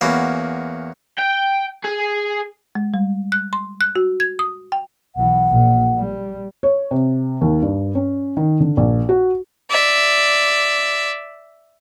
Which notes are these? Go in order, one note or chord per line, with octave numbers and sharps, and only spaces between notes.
E2 A#3 C#4 F#4 B5
G5
G#4
G#3
G3
F#6
C6
F#6
F#4
G#6
D#6
G5
B1 E3 F#5
A#1 A#2
G3
C#5
C3
D#2
G2
C#4
D#3
D3
A#1
F#4
D5 E5